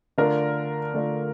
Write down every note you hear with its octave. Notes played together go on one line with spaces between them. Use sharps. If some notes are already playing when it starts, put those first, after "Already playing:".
D3 A3 D4 F4 A#4
D3 A3 D4 F4